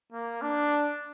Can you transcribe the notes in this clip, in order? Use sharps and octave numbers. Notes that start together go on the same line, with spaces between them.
A#3
D4